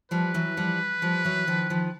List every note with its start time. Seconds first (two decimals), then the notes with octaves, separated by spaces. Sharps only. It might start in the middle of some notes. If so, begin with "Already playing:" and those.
0.11 F3 G3 B4
0.34 E3 F#3
0.57 F3 G3
1.02 F3 G3
1.25 E3 F#3
1.47 D#3 F3
1.70 D#3 F3